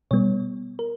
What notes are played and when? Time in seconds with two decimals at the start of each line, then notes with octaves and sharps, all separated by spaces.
0.11 B2 G3 B3 C#5
0.79 A#4